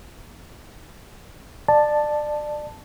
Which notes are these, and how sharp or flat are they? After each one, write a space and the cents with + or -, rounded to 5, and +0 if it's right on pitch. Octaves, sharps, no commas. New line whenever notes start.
D5 +25 A5 +0